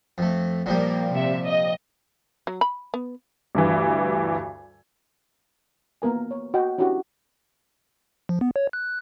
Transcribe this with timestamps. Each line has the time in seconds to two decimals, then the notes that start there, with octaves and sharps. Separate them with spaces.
0.18 F2 A3
0.66 A#2 F3 G3 A#3
1.11 C3 E5
1.45 D#5
2.47 F#3
2.61 B5
2.94 B3
3.55 D2 G2 E3
6.02 A#3 B3 A#4 G#5
6.31 C#5
6.54 F#4 D#5 G5
6.78 C#4 D4 E4 F#4 G4
8.29 F3
8.41 B3
8.56 C#5
8.73 F#6